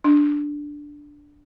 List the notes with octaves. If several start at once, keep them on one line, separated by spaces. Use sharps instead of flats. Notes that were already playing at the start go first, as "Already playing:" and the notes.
D4